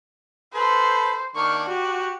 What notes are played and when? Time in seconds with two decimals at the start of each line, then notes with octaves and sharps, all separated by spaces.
0.55 A4 B4 C5
1.36 D#3 A#3 D4 C#6
1.69 F#4 G4